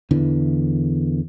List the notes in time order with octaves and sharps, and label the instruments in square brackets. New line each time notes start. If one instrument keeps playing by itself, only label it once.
[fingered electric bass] E2 D3 E3